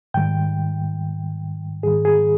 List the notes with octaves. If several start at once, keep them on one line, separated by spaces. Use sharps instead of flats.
G#2 D#3 G3 G5
G#2 D#3 G3 G#4
G#4